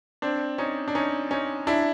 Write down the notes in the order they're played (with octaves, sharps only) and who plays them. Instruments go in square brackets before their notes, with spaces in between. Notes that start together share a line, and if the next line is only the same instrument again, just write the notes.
[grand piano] C4 D4
C#4 D#4
D4
C#4 D#4
C#4 D#4
D4 E4